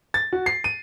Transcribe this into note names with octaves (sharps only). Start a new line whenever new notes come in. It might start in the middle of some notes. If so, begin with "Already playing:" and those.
A6
F#4
C7
D#7